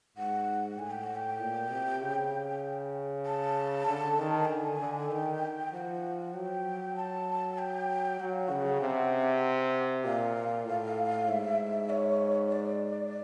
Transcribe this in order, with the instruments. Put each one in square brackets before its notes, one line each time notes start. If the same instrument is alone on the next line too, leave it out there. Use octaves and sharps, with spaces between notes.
[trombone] G#2 [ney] F#5
[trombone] A2 [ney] G#5
[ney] G5
F#5
G5
[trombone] A#2
C3
C#3
[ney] A5
[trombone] D3
D#3
[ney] G5
[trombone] D3 [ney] G#5
[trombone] D3
[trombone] D#3 [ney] G5
[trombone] F3 [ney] F#5
[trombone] F#3 [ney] G5
[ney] A5
G5
[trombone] F#3 [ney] F#5
[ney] F5
[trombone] C#3 [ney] F#5
[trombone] C3
[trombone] A#2 [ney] F5
[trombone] A2
[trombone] G#2 [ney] E5
[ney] C#5
D5